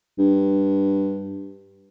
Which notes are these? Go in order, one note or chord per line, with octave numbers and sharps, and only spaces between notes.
G2